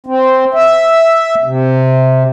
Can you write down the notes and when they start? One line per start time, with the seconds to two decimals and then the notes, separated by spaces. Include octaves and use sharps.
0.06 C4
0.54 E5
1.44 C3